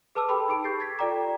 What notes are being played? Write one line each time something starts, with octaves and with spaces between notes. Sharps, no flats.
G#4 B4 A5 D6 E6
G4 A4 G5 B5 C6 D6
D#4 G4 G#4 D7
C#6 G6 A6 C7
G#6 A6 B6
F4 A4 D5 G5 A#5 D6